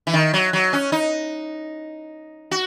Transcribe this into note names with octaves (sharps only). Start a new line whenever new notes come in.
E3
D#3
F#3
F#3
C#4
D#4
F#4